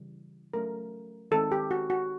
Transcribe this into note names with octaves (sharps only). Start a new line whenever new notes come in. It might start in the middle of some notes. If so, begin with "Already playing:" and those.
Already playing: C#3 E3 G3
F#3 A3 C#4 A#4
D#3 G#3 C4 A4
G4
F#4
F#4